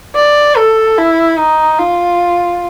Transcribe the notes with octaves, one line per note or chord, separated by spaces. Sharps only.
D5
A4
E4
D#4
F4